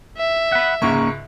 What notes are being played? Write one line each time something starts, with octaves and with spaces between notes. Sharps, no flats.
E5
F#5 B5
C#2 G#2 A#3 C#4 A#4 C#6